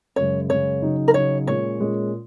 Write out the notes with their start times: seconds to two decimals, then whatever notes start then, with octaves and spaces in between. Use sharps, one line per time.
0.16 F#2 C#3 G#3 C#5
0.49 F#2 C#3 G#3 C#5
0.82 C#3 F#3 D#4
1.08 A#4
1.14 C#3 F#3 D#4 C#5
1.47 A#2 G#3 C#4 C#5
1.79 A#2 G#3 C#4